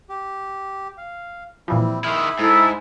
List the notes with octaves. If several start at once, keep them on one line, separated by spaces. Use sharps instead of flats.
G4
F5
A#2 E3 F3 G3 C4 E4
D#3 E4 G#4 E5 B5 C6 F6
G#2 E4 A4